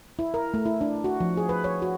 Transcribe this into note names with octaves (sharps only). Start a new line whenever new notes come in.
E4
A#4
A3
E4
D4
F#4
F3
G#4
B4
C#5
F#4